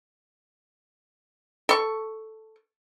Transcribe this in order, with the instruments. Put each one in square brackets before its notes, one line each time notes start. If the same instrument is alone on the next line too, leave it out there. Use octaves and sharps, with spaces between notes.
[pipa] A4 C#6